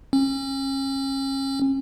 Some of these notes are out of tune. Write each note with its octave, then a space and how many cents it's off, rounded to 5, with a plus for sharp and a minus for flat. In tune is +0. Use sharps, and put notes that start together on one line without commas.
C#4 -35